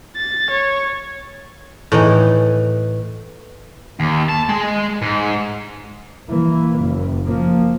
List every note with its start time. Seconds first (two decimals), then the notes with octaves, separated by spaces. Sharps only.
0.17 A6
0.51 C#5
1.92 A2 E3 D#4
4.00 D#2
4.29 A5
4.49 G#3
5.02 G#2
6.28 E3 A#3
6.80 F#1
7.25 F3 A#3